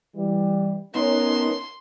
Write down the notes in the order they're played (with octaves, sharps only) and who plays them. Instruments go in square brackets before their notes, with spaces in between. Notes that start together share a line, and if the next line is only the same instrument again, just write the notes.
[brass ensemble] E3 G3
[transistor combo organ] B3 D#4 [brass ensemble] C#4 A#4 [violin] C6